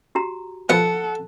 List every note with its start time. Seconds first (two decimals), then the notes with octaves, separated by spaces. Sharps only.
0.15 F#4 G4 A#5
0.69 F3 B3 A4 F#5